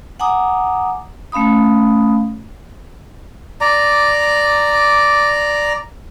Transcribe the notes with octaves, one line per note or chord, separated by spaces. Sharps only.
F#5 G#5 A#5 D6 D#6
A3 C#4 F5 B5 D#6
D5 A#5